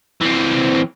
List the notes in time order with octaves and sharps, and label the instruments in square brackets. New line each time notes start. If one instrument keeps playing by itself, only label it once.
[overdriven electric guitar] E3 C4